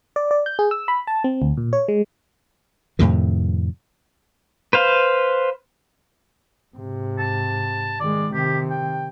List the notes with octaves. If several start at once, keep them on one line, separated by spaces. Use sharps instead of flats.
D5
D5
G6
G#4
E6
B5
A5
C4
D2
A#2
C#5
G#3
F2 A2 C3 D#3
B4 C5 F5
G#2 C3
A5
D#3 G#3 D5
C3 D#3 G4
G5